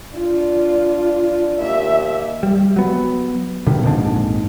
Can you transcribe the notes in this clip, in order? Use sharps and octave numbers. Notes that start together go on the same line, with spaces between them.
D4 F4
D#2 E5
G3
F#3 B3
G2 B2 D3 D#3
A#1 F2 G#2 D4